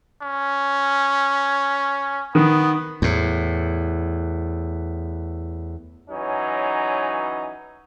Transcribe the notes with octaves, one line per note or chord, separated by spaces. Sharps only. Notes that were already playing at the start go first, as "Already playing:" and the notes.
C#4
D#3 B3
E2 A2
E3 F#3 C#4 D#4